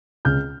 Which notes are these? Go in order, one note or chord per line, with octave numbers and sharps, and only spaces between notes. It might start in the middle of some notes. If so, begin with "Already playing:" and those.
C#2 F6 G6